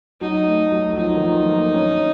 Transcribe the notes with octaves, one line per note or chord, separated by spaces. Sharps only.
F#3 D#4
A3
F#3
F#3
F3 D#4
D#3
F3
A#3
C#4